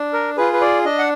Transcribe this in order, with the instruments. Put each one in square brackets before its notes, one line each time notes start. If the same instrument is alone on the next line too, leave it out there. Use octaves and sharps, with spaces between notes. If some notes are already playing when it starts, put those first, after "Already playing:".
Already playing: [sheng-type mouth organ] D4
A#4
F4 G#4 B4
B4
D5
D4 D#5
F#5